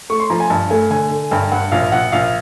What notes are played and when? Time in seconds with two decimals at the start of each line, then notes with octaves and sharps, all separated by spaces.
0.10 A3 C#6
0.20 C6
0.30 F3 A#5
0.40 G#5
0.50 G2 A5
0.70 A3 G#5
0.90 D3 G#5
1.11 D3
1.31 G2 G5
1.52 G2 F#5
1.72 A#1 F5
1.92 A#1 F#5
2.12 A#1 F5